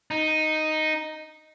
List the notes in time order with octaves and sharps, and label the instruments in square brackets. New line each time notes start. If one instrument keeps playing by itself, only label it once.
[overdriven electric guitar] D#4